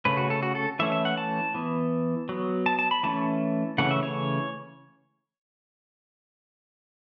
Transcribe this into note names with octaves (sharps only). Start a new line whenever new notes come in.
C#3 A3 C#4 B4
F#4
A4
F#4
A4
E3 A3 C#4 E5
E5
F#5
A5
E3 B3
F#3 B3
A5
A5
B5
E3 A3 C#4 A5
C#3 E3 A3 C#4 F#5
E5
C#5